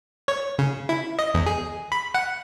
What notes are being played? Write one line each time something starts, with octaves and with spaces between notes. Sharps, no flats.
C#5
C#3
E4
D#5
E2
G#4
B5
F#5